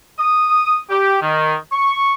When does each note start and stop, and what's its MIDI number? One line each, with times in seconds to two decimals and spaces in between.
0.19 0.81 87
0.90 1.17 67
1.22 1.54 51
1.72 2.14 85